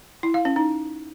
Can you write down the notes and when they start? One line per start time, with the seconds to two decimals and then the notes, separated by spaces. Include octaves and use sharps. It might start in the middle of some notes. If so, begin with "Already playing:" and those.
0.23 E4
0.34 F5
0.45 C#4
0.56 D#4